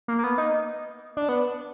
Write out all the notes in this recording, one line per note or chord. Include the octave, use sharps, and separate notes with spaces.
A#3
A#3
B3
D#4
D4
B3